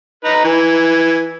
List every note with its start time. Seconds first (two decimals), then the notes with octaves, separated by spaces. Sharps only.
0.25 D#4 B4 A#5
0.45 E3 G#5